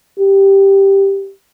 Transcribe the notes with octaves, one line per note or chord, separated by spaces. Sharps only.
G4